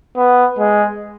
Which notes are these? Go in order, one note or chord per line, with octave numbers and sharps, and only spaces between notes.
B3
G#3